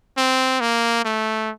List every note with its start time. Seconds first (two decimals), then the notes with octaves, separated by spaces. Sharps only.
0.17 C4
0.60 A#3
1.05 A3